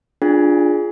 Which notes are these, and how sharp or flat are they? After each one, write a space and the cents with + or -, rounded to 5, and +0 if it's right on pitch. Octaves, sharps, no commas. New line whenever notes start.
D4 +0 F4 +0 G#4 +0